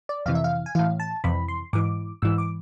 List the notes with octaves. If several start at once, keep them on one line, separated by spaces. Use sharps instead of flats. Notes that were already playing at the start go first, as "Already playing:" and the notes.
D5
F2 C3 E3 F5
E5
F5
G#5
A2 E3 F5
A5
F2 C3 E3 B5
C6
G#2 E3 D6
G#2 E3 E6
D6